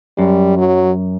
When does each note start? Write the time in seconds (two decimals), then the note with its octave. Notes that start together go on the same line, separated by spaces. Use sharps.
0.18 F#2 G3
0.57 F#3